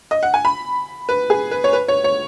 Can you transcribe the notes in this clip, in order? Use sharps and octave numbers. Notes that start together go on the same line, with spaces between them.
D#5
F#5
G#5
B5
B4
G#4
B4
C#5
B4
C#5
C#5